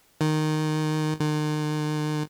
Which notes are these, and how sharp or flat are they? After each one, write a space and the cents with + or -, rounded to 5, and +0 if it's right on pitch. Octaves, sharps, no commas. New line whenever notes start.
D#3 -10
D#3 -40